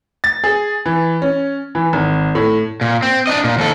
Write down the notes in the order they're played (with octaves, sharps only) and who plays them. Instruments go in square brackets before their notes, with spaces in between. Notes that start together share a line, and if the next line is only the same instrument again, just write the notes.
[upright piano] A6
G#4
E3
C#4
E3
G#1
A2
[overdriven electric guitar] A#2
C4
D4 D#5
A#2
D#2 A4